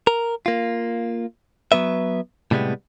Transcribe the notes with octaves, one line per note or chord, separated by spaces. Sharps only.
A#4
A#3 F4
F#3 B3 B4 E5
A2 C3 G3 G#3 B3